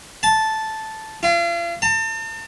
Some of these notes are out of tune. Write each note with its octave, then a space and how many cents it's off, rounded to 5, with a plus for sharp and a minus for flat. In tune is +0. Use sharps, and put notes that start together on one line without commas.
A5 -5
F4 -40
A5 +40